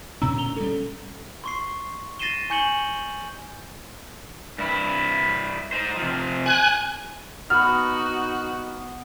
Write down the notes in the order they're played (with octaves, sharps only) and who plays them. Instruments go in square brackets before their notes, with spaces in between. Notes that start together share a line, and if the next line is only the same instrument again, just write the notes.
[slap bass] D2 A#2 C#4 [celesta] A#5 E6
[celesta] F7 G7
[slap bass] G3 C#4 [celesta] A4
[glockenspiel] C6 C#6 C7
A6 A#6 C7 D#7 E7 G7
G#5 C#6 G6 C#7 F#7 G7
[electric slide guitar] G2 E4
D#4 C5
C3 F3
[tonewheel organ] G#5 F#6
[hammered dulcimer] B3 [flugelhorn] D#4 [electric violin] F#4 [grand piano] F6